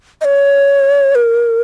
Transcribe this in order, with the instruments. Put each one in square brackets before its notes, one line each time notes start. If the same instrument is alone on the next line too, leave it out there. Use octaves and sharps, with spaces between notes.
[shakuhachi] D#5
C#5
A#4